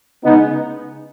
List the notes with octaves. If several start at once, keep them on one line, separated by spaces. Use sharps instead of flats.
C#3 G#3 B3 D#4